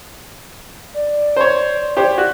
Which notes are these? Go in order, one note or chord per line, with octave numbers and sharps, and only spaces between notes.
D5
C5 C#5
G4 C5 C#5
F#4